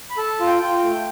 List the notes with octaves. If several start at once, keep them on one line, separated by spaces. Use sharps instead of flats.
B5
A4 A5
F4
G5
F4
G5
A3